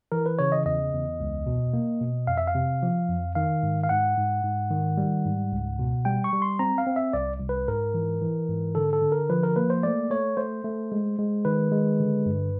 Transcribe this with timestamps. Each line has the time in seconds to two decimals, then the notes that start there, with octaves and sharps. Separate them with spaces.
0.12 E3 A#4
0.26 B4
0.39 C#3 C#5
0.52 D#5
0.66 E2 D#5
0.93 E2
1.20 C#2
1.47 B2
1.73 A#3
2.00 B2
2.27 F2 F5
2.38 E5
2.47 F5
2.55 C3
2.83 F3
3.09 F2
3.35 D#3 F5
3.63 G#2
3.83 F5
3.89 G#2 F#5
4.17 G#2
4.44 G#2
4.71 D#3
4.98 G3
5.25 G#2
5.52 C#2
5.79 B2
6.05 G3 G5
6.24 C#6
6.33 G3
6.42 C6
6.59 C4 A#5
6.78 F5
6.87 C4
6.96 E5
7.13 C2 D5
7.40 C2
7.49 B4
7.68 G#2 A#4
7.94 E3
8.21 E3
8.48 G#2
8.75 D3 A4
8.93 A4
9.02 D3
9.12 A#4
9.30 F3 B4
9.43 A#4
9.56 A#3 B4
9.70 C5
9.83 A3 D5
10.10 A3 C#5
10.37 A3 C5
10.64 A3
10.92 G#3
11.19 G#3
11.45 D#3 B4
11.72 G#3
12.00 D3
12.26 G2